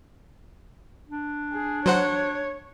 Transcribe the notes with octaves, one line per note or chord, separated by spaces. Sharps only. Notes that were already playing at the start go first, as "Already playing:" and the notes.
D4
G#4
F#3 C5 C#5 F#5